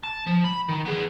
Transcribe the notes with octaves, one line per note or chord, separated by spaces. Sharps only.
A5
F3
B5
D#3
B3 G#4